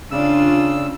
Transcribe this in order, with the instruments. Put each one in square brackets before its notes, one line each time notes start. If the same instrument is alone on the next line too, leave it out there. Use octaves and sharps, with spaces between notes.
[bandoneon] C#3 E6 [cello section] D4 F4